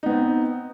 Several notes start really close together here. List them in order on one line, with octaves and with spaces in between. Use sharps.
D#4 B3 C4